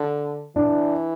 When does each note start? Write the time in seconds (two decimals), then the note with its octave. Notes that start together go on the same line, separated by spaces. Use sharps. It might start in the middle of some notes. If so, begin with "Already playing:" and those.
Already playing: D3
0.56 E3 D4